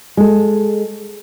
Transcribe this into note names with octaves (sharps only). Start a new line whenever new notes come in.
G#3 A4